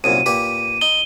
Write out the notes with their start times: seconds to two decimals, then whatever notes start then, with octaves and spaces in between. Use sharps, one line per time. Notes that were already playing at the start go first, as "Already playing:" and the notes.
0.04 C2 F#2 A#2 D#7
0.26 A#2 G4 B4
0.81 D#4 G7